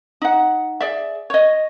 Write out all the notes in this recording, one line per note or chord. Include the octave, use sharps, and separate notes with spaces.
D#4 F#5
G#4 D5 E5
C#5 D#5